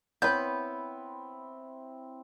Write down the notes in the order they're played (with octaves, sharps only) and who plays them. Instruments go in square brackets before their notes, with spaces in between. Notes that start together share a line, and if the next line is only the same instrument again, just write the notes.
[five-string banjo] B3 B4 [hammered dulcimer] C4 E4 [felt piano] C#5 [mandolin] G6